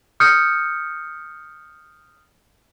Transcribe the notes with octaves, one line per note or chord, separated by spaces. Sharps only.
D#6 F6 G6 C#7